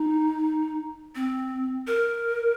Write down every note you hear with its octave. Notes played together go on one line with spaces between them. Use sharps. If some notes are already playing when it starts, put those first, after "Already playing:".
Already playing: D#4
C4
A#4